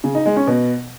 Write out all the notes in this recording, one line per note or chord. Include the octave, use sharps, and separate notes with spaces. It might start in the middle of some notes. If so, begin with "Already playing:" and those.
C#3
D#4
G#3
C#4
B2